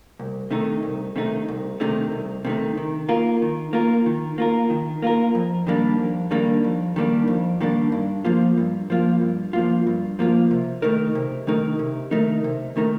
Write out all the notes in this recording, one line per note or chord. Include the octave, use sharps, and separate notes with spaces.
C2
C3 D#3 A3 D#4
C2
C3 D#3 A3 D#4
C2
C3 D#3 A3 D#4
C2
C3 D#3 A3 D#4
D#3
A#3 F4 A#4
D#3
A#3 F4 A#4
D#3
A#3 F4 A#4
D#3
A#3 F4 A#4
F2
D#3 G3 A#3 D4
F2
D#3 G3 A#3 D4
F2
D#3 G3 A#3 D4
F2
D#3 G3 A#3 D4
G2
F3 A#3 F4
G2
F3 A#3 F4
G2
F3 A#3 F4
G2
F3 A#3 F4
C3
D#3 A3 D#4 A#4
C3
D#3 A3 D#4 A#4
C3
D#3 A3 D#4 A#4
C3
D#3 A3 D#4 A#4